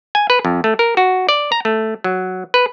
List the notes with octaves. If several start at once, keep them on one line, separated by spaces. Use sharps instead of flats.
G#5
B4
F2
A3
A#4
F#4
D5
A#5
A3
F#3
B4